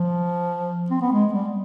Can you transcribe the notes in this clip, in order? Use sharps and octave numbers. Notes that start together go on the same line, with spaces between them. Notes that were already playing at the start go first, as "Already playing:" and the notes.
Already playing: F3
C4
B3
G#3
G3